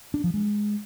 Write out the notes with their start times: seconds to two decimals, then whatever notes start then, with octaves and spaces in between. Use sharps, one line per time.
0.14 D4
0.24 F3
0.34 G#3